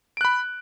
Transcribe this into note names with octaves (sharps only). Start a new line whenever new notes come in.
B5 F#6 D7